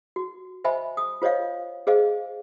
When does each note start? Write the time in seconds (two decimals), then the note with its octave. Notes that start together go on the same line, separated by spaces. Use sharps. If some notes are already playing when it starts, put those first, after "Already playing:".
0.16 F#4
0.64 C5 D#5 E5 G#5 B5
0.97 D#6
1.22 F4 C5 C#5 D#5 F5
1.87 G#4 C5 D#5 F5